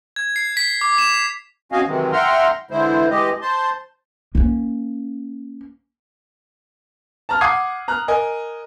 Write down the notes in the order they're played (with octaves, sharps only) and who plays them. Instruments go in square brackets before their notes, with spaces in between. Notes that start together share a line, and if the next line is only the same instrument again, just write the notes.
[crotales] G#6
C7
B6
D6
E7
[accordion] C4 C#4 F#4 D#5 F5 G#5
C3 D#3 E3 F#3 G#3 C4
E5 F#5 G5 A#5 C6 F6
D3 E3 G#3 E4 C5
E3 G#3 G4 D#5
C5 A5 C6
[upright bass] A#3 C#4
[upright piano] A5 A#5 F6
F#5 D6 D#6 G#6 C7 D#7
A#5 F6 F#6
A#4 D#5 G#5